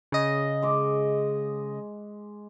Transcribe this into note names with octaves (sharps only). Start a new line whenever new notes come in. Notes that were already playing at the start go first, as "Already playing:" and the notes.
C#3 D#5
G#3 D6